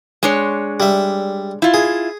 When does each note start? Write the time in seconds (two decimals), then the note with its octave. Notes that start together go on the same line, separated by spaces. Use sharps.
0.23 G#3 D4 C#5
0.80 G3 E5
1.62 E4 F4
1.74 G#4